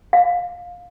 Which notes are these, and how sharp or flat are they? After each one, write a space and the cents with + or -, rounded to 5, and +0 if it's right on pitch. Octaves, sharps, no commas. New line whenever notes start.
F5 +20